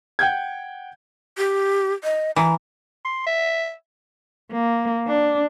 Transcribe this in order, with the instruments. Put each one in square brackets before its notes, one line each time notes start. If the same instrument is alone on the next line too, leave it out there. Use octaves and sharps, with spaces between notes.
[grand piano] F#5 G5 G6 G#6
[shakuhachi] G4
D#5
[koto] E3 [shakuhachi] A#5
[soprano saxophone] C6
E5
[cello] A#3
D4